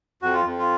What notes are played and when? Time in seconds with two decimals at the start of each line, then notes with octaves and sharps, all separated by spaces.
0.22 F2 F#4
0.33 F4
0.45 F2
0.59 F4